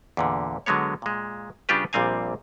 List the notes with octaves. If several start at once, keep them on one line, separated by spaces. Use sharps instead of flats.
E2 A#2 D3
D3 F#3 G#3 B3 C#5
A#2 G#3
C#3 G3 D4 F4 G4 B4
A#1 A#2 G3 C4 F5 G#5